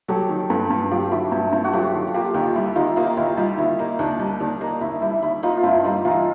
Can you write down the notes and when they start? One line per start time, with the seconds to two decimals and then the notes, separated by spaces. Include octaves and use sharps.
0.08 F#3 G4 A4
0.29 D#3
0.50 G2 A4 B4
0.70 G2
0.91 F#3 F4 G4
1.11 D#3 E4 F#4
1.32 G2
1.53 G2 E4
1.64 F#4
1.73 F#3 F4 G4
1.94 D#3
2.14 A#3 F4 G4
2.34 D#2 D#4 F4
2.55 G3 E4
2.76 D#3 D#4 F4
2.96 A#3 D#4 F4
3.07 D#4
3.17 D#2 E4
3.37 G3 D#4 F4
3.58 D#3 E4
3.79 A#3 D#4
3.99 D#2 D4
4.19 G3 D#4
4.40 D#3 D4
4.61 A#3 D#4
4.81 D#2 E4
5.01 G3 E4
5.22 D#3 E4
5.43 A#3 D#4 F4
5.57 F4
5.63 G2 E4
5.84 G3 D#4 F4
6.05 E3 D#4 F4